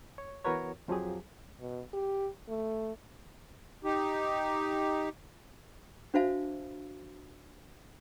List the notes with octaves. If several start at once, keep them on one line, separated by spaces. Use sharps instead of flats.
C#5
E3 B3 F#4 A#4 B4 C#5
F2 F3 F#3 G4 G#4
B2
G4
A3
D#4 G4
D4 F#4 C5 E5 F5 A5